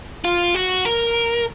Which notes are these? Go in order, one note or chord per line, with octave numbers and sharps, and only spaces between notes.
F4
F#4
A#4